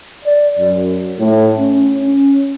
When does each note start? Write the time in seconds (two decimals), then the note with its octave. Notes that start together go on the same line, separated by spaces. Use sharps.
0.24 D5
0.59 F#2
1.19 A2
1.58 C#4
2.00 C#4